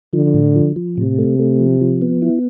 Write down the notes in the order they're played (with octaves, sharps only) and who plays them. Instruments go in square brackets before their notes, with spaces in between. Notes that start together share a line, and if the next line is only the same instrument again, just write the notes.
[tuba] D3 [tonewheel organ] F3
[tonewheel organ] A2
F3
F3
[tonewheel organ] A2 [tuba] C3
[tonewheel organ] A3
A3
F3
F3
B3
E4